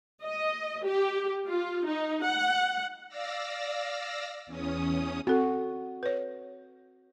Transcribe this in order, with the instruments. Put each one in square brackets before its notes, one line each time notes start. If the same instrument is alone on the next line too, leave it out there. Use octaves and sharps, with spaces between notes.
[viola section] D#5
G4
F4
D#4
F#5
[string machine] D5 F5 E6 A#6
E2 C#4 D#6
[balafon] C4 A4 [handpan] F#4
[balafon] B4 C#5